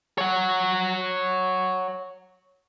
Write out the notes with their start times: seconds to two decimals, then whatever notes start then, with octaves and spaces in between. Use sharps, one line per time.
0.18 C#5 F#5